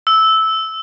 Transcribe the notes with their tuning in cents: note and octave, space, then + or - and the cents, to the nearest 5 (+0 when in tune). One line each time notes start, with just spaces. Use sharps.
E6 -10